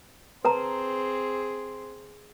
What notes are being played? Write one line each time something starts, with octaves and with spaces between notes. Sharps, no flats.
C4 G#4 B4 A5 A#5